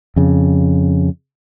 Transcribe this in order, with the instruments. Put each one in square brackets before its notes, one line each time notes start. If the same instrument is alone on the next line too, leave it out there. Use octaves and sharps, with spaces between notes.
[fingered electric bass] F2 C#3